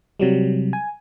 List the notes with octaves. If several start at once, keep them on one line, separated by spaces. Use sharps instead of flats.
C3 F#3 G3
G#5